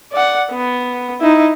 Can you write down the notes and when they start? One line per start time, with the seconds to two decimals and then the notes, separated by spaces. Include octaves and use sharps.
0.12 D5 F#5
0.51 B3
1.20 D#4 E4